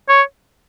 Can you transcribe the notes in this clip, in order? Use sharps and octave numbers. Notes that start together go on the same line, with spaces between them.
C#5